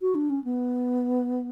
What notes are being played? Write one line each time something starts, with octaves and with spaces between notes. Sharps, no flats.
F#4
D4
C#4
B3